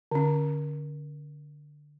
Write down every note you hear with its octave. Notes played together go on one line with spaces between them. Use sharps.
D3 C#4